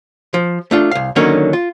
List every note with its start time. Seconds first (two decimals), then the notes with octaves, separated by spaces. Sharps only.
0.34 F3
0.71 A3 D4 F4
0.91 C2 F5
1.16 D3 D#3 F#3 A#3 C#4 D#4
1.53 F4